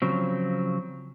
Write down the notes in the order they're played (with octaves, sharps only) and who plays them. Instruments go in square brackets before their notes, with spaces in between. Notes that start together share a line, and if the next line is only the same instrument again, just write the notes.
[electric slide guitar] C#3 F3 F#3 C4